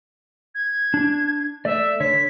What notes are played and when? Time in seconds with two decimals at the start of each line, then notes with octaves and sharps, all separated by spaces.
0.55 G#6
0.94 D4
1.65 A3 D5 E5
2.00 D3 C#5 B6